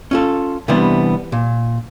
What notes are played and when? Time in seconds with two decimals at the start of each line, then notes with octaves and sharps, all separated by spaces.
0.11 C#4 F4 A4
0.68 C3 E3 G3 B3 D4
1.32 A#2